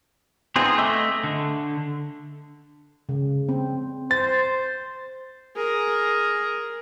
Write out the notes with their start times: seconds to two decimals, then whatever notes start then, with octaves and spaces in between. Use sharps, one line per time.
0.56 B3 C4 D#4 F4 G#4
0.78 A3 D#5 E5 D6 E6
1.24 D3
3.09 C#3
3.49 C4
4.11 C5 A6
5.56 G#4 A#4